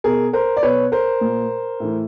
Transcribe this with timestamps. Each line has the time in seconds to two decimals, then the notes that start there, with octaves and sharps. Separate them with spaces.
0.04 B2 G#4 A#4
0.33 A#4 C5
0.57 D5
0.63 B2 B4 C#5
0.92 A#4 C5
1.21 A#2
1.80 A2 E3